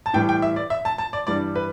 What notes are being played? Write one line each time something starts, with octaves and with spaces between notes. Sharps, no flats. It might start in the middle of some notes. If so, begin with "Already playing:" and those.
A5
A2 E3 G3 G5
G5
E5
D5
E5
A5
A5
D5
G2 E3 G3 D5
B4